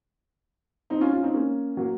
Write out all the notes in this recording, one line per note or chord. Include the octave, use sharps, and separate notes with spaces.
C4 D#4
C#4 F4
C#4 F4
C4 D#4
A#3 C#4
F#3 A#3